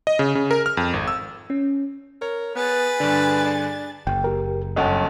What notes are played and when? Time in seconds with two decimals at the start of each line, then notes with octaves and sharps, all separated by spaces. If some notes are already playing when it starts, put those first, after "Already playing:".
0.07 D#5
0.19 C#3
0.35 C#3
0.51 A#4
0.66 F6
0.77 F2
0.93 G#1
1.08 E6
1.50 C#4
2.22 A#4 C#5
2.56 B3 G#4 B4 A6
3.00 G2 D3 D4
3.45 D4
4.07 F#1 G5
4.24 G4 A#4
4.76 D1 G1 C#4 D#5 F#5 A5